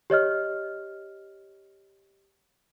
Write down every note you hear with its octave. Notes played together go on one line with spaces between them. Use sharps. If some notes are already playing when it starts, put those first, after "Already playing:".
G4 C#5 D#5 F6